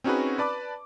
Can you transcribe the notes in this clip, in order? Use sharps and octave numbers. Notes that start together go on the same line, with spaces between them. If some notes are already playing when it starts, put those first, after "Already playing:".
C4 C#4 D#4 F#4 G#4 B4
B4 D5 A5 B5 D6